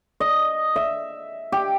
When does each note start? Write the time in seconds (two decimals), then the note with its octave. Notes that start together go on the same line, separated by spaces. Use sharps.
0.20 D#5
0.76 E5
1.52 G4